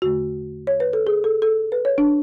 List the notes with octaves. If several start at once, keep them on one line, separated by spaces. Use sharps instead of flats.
E2 D3 A3 F#4
C#5
B4
A4
G#4
A4
A4
B4
C#5
D4